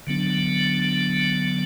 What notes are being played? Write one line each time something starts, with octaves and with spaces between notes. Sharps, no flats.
D3 F#3 B3 D4